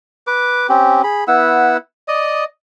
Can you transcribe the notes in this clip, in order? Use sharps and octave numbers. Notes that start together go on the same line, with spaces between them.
B4 D6
C4 C#4 G4
G#4 B5
B3 E4 F#5 E6
D5 D#5 D#6